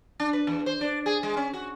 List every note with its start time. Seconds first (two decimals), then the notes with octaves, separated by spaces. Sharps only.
0.20 D4
0.33 B4
0.47 E2
0.66 C5
0.81 D4
1.06 G#4
1.23 G#3
1.37 C#4
1.53 F#4